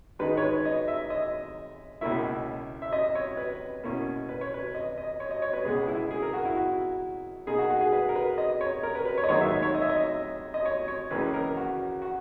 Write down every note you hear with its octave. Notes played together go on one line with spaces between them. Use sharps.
G#2 D#3 G#3 D#4 B4
C#5
B4
D#5
E5
D#5
C#2 B2 A#3 C#4 E4 E5
E5
D#5
C#5
B4
B2 A#3 C#4 E4
B4
C#5
B4
D#5
D#5
C#5
D#5
C#5
B4
C#2 B2 G#3 B3 G#4
E4
G#4
A#4
F#4
E4
F#4
B2 A#3 D#4 G#4
F#4
F#4
G#4
B4
A#4
B4
D#5
C#5
A#4
B4
B4
C#5
D#5
G#2 D#3 F#3 A#3 D#4 C#5
E5
C#5
D#5
E5
D#5
D#5
C#5
C#5
C#2 C#3 E3 A#3 C#4 B4
A#4
F#4
F#4